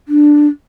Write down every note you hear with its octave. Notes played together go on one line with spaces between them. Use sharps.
D4